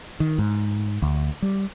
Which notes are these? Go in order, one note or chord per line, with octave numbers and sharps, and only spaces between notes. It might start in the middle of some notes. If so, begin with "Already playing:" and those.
D#3
G#2
D2
G3